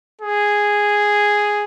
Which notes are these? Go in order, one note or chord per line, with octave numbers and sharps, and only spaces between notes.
G#4